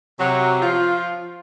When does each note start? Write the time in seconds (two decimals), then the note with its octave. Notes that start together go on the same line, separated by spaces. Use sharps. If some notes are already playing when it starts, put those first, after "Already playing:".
0.20 C3 F#3
0.62 F3 F4